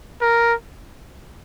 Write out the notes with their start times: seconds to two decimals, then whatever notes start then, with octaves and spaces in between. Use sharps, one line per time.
0.21 A#4